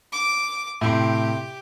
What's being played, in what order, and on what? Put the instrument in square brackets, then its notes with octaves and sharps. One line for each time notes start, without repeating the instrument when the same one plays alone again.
[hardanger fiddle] D6
[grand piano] A2 C3 C6 [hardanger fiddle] G4